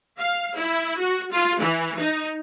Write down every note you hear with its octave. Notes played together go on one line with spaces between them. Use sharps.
F5
E4
F#4
F4
E3
D#4